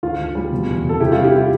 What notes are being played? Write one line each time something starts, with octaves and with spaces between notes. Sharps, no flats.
D2 F4
D2
G3
B2
E2
B2
A4
C3 E4 G4
F4
G3
E4 G4
F4